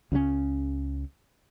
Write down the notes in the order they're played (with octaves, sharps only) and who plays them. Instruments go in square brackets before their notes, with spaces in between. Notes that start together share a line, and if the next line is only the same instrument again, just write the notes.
[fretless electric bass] C#2 C#3 F3 C#4